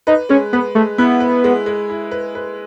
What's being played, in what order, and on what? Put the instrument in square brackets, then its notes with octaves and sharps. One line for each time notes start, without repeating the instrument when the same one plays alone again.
[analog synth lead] D#4 [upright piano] B4
[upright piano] G#3 [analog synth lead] C#4
[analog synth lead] B3 [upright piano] B4
[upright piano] G#3 [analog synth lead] A3
[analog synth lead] B3 [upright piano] E4
[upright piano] B4
G#3
G#3
E4
B4
B4